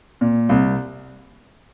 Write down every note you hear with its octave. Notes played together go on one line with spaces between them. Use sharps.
A#2
C2